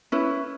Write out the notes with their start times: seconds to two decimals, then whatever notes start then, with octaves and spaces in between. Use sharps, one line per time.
0.12 C#4 E4 B4